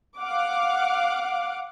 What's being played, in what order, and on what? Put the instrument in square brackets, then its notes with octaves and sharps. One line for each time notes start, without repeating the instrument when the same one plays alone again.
[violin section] F5 F#5 D6